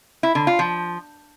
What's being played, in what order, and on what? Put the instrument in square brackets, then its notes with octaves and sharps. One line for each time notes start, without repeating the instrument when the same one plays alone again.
[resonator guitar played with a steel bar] E4
D3
F4
F3